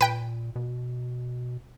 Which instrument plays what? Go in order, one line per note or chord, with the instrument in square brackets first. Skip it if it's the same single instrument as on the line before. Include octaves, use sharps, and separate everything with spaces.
[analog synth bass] A#2 [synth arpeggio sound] B4 G5
[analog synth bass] B2